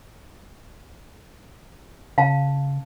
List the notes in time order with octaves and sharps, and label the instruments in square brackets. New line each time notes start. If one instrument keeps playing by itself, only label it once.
[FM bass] C#3 [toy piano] F5 A5